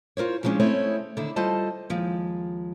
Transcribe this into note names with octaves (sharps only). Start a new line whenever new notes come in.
F4 A#4 C5 C#5
C#3 F3 G#3 A#3 C#4 D4
A3 C4 C#4 E4 C#5 D#5
D3 D#3 E4
G3 F4 A4 C5 D#5 A5
D#2 F3 G#3